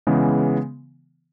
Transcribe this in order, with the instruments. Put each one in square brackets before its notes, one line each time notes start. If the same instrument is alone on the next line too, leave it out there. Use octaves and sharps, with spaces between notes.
[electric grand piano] C#3 E3 G#3 B3